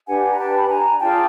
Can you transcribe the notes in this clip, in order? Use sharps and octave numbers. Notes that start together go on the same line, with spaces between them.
D4 G4 B4 F#5 G#5
A#5
G5 A5
B5
G#5 A#5
D4 F4 G#4 G5 A5